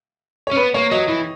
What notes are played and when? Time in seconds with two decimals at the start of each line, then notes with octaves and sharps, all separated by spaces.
0.47 C#4 C#5
0.56 B3 B4
0.74 A#3 C#5
0.91 F#3 D#5
1.08 E3